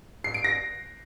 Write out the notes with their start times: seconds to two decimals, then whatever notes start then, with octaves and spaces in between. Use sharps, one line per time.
0.24 C7
0.34 D7
0.44 A#6